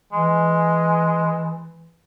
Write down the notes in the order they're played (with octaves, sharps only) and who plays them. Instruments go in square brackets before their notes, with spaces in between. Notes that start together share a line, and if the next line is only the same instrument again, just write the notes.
[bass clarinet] E3 [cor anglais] G#3